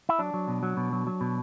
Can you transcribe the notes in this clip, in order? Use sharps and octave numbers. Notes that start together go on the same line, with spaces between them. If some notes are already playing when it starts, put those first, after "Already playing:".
E4
F#3 D4
F#3
B2
F#3
B2
F#3
F#3
B2